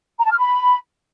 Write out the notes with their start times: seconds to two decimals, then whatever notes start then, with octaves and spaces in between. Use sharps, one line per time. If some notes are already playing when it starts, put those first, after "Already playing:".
0.19 A#5
0.25 A5
0.31 F6
0.38 B5